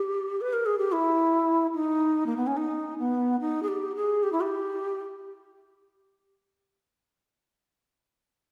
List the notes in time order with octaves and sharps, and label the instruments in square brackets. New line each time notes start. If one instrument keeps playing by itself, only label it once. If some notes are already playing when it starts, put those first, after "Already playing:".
Already playing: [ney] G4
B4
A#4
G#4
G4
E4
D#4
A#3
B3
C#4
D#4
B3
D#4
G#4
G4
G#4
G4
E4
G4